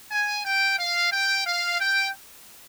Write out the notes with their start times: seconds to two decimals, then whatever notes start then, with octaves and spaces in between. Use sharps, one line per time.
0.11 G#5
0.45 G5
0.78 F5
1.12 G5
1.46 F5
1.80 G5